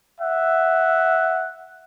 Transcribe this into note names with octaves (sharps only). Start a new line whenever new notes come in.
E5 F#5